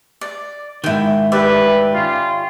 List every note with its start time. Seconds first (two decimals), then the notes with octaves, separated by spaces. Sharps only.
0.21 D5
0.84 G#2 D#3 E4 G5
1.32 A3 G4 B4 D5 E5
1.94 C#4 F4